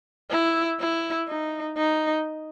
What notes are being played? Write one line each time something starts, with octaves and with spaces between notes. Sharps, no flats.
E4
E4
D#4
D#4